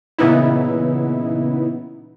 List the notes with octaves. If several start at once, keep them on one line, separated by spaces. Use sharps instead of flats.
A#2 C#3 E3 B3 D#4 E4